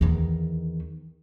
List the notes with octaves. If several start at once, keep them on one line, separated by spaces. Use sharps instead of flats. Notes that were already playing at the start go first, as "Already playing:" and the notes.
E2 D#3